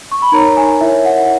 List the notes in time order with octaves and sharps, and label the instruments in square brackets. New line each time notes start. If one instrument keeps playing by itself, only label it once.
[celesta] C#6
B5
D#4 A#4 C#5 A#5
G#5
E4 A#4 C#5 E5
F#5